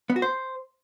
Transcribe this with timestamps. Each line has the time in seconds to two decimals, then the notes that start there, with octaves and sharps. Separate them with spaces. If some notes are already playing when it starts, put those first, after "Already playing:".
0.10 B3
0.16 F#4
0.22 C5